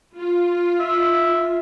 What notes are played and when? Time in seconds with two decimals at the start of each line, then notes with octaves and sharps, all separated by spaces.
0.17 F4
0.80 E5